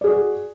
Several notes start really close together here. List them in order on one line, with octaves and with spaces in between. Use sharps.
D5 G#4 F#4